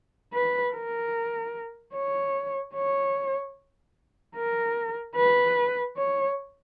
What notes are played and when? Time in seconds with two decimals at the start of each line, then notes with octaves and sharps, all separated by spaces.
0.34 B4
0.74 A#4
1.95 C#5
2.75 C#5
4.36 A#4
5.16 B4
5.97 C#5